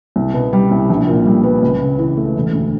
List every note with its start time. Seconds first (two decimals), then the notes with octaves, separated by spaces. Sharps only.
0.16 C2
0.34 B2
0.53 G3
0.71 C2
0.90 A#1
1.07 A#2
1.25 G3
1.43 B3
1.62 C#2
1.81 C#3
1.99 E3
2.17 A3
2.36 E1
2.53 D2